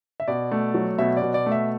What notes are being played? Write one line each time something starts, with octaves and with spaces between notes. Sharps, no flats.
E5
B2 D5
A3
F#3
B2 E5
D5
B2
D5
A3
E5